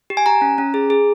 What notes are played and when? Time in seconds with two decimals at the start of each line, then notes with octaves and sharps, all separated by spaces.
0.10 G4
0.17 G#5
0.26 G4 A#5
0.42 C#4
0.58 C#4
0.74 G#4
0.90 G#4